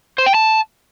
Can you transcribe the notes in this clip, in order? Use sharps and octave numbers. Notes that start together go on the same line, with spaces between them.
C5
G5
A5